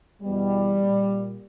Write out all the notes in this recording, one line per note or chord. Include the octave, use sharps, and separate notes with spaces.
E2 B2 G3
A#2